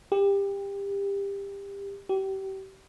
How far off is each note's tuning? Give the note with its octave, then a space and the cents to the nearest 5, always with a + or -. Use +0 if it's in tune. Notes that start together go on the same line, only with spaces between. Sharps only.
G4 +25
G4 -30